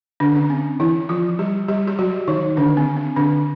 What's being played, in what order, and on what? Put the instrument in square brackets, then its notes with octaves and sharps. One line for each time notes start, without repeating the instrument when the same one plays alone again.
[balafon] D3 D4
C#4
C4
E3 E4
F3 F4
G3 G4
G3 G4
G4
F#3 F#4
D#3 D#4
D3 D4
C4
C4
D3 D4